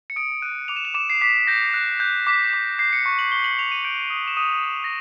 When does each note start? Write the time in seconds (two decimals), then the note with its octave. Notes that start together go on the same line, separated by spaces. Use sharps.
0.10 C#7
0.16 D#6 D7
0.42 F#6 D#7
0.68 D6 F7
0.76 E7
0.85 F7
0.94 D6 E7
1.10 C7
1.21 D6 B6
1.47 G6 A#6
1.74 F#6
2.00 F#6 G6
2.27 D6 B6
2.53 D6
2.79 G6 C7
2.93 C#7
3.06 C#6
3.19 F#7
3.32 C#6 G7
3.44 F#7
3.58 C#6 F7
3.72 D#7
3.84 G6 D7
4.10 D#6
4.27 E7
4.37 D#6 D#7
4.53 D#7
4.63 D#6 E7
4.84 A#6